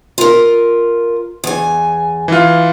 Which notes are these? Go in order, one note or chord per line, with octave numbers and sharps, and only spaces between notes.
F4 A#4
E2 G#5
E3 F4